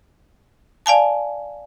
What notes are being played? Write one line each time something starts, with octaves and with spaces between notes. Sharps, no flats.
D5 F5 G#5 A5